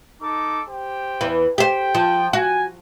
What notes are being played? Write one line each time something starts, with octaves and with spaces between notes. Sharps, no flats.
D#4 A4 D6
G4 C5 G5
E2 E3
G4 C5 G5
F3
F#4 G#5